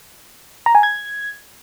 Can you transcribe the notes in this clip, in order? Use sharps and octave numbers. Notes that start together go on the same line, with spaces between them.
A#5
G#5
G#6